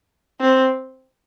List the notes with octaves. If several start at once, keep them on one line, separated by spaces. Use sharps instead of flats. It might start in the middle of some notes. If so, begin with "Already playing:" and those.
C4